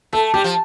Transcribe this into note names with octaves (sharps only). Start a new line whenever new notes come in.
A3 A4
G3 G4
F3